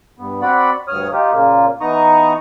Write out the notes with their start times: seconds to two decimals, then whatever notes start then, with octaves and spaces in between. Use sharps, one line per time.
0.18 G2 B3
0.42 C4 F#4 D5 F#5 B5
0.88 D2 G2 C#5 D#6 F6
1.13 D#4 F4 G4
1.32 A#2 C#3 A#3 F4
1.81 E3 B3 D#4 A#5 C#6 D#6